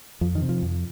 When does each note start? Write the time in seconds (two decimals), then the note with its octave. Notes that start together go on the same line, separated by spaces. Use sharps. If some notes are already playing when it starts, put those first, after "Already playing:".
0.21 F2 F3
0.35 D#3
0.42 C3
0.49 F3
0.62 F2